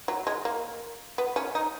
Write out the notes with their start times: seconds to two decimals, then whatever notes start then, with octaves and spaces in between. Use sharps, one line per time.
0.08 F#3
0.27 G#3
0.45 A#3
1.18 B3
1.36 C#4
1.55 D#4